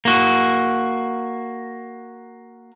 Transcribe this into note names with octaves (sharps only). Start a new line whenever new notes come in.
A#3 F#4